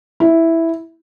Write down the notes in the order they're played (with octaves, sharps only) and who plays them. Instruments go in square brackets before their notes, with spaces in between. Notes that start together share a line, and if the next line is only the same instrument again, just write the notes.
[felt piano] E4